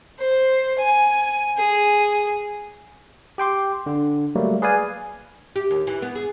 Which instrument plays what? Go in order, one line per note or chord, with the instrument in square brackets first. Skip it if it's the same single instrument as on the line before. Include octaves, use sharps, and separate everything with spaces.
[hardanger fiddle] C5
G#5
G#4
[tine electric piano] G4 G5 C6 D6
D3
F#3 G3 A3 A#3
G#4 B4 D5 F5 G#5
[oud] G4
D#2
E3
B3
G#4